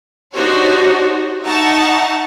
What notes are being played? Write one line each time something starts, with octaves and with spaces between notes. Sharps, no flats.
D4 D#4 F#4 G4 C5 C#5
D#4 E5 F#5 A5 A#5 C#6